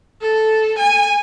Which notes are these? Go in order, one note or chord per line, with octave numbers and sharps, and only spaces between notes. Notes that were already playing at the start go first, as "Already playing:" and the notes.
A4
G#5